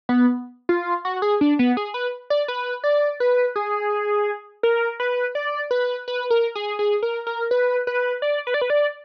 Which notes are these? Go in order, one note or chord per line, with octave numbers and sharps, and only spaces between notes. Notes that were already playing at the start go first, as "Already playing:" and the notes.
B3
F4
F#4
G#4
D4
B3
G#4
B4
D5
B4
D5
B4
G#4
A#4
B4
D5
B4
B4
A#4
G#4
G#4
A#4
A#4
B4
B4
D5
B4
D5
B4
D5